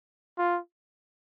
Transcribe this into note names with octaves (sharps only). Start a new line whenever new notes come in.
F4